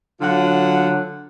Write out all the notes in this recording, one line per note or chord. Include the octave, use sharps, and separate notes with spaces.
D3 F#3 F4 F#5